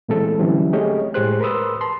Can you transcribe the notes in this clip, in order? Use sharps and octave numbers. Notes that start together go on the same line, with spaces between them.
A#2 E3 G#3 A3 C4 A4
D3 E3 F#3 G3 C4 C#4
A3 G4 G#4 C#5 D#5
A2 G#3 G4 G#4 C5 F#6
A#4 B4 B5 C6 D#6 E6
A5 C6